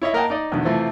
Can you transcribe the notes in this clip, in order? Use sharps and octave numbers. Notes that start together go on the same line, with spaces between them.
E4 C#5 D#5 E5
A#3 A#4 D#5 F#5 G5 A5
D#4 D5 D#5
E2 B2 D3 D#3
C3 E3 F3 A3 C4